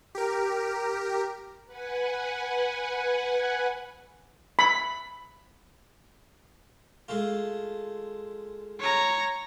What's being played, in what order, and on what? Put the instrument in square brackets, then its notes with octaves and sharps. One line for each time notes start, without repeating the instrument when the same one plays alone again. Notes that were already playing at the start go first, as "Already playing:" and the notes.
[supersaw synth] G4 A#4
[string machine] B4 F#5 G#5
[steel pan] B5
[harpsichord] G#3 A3 F4
[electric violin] C#5 A#5